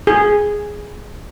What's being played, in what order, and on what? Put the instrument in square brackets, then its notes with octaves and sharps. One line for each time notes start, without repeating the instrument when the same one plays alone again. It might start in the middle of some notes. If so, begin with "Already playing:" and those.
[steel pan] G#4